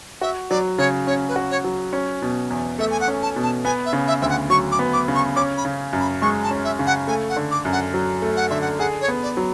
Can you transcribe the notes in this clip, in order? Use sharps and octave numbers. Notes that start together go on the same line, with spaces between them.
F#4 E5
F#3 D5
C#3 C#5
C#4 C#5
B4
F#4
C#5
F#3
C#4
B2
E2
A3 E5
G#5
F#5
C#4
A5
B2
A5
B3 G#5
E5
C#3
E5
D2 E5
F#5
F#3 C#6
D6
B3
D6
C#3
C#6
C#4 D6
B5
C#3
F#2
B5
G#3 C#6
A5
C#4
E5
C#3
F#5
A3 G#5
F#5
D3
D6
F#2
F#5
F#3
A3
F#5
D3 E5
F#5
G#4 F#5
C#5
B3
D5
F#3